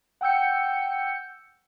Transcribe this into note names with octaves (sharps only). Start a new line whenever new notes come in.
F#5 G5 E6 G6 C#7